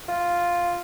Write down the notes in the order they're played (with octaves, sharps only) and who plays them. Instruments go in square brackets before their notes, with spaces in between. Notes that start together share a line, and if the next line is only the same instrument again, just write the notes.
[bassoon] F4